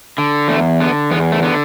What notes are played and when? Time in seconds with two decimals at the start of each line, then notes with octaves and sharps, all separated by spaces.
0.18 D3
0.48 E2 A3
0.80 D3 B3
1.11 E2 B3
1.32 A3
1.42 D3 B3